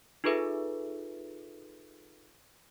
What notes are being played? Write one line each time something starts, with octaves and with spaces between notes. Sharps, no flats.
D#4 F4 G#4 A4 B4 E5